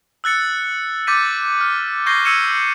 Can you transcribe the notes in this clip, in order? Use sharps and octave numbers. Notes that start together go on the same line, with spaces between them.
E6 F#6 A6 C#7
D6 G6 A6 B6 D#7
F6
C#6 G6 G#6 A#6 C7 G7
E6 G#6 C#7 D#7 E7